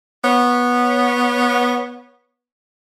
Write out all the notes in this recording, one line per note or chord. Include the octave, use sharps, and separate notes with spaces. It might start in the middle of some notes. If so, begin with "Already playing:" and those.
B3 C#5